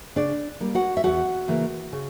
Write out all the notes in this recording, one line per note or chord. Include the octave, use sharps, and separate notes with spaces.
C#3 D4 D5
G3 A#3
F#4 F#5
E5
E2 F#4 F#5
C#3 E3 A#3
C#3